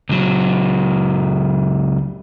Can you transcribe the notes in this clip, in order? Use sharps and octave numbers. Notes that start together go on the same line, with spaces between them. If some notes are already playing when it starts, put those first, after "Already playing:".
C#2 F#3